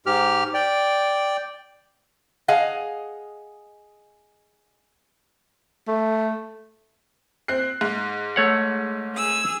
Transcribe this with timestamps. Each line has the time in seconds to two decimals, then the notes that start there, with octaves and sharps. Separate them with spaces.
0.06 G#2 G4 F6
0.54 D5 G5
2.48 G#4 D#5 F5 F#5
5.88 A3
7.48 C4 F#6 C7
7.81 G#2
8.36 A3 C#5 F#5
9.15 G#4 E6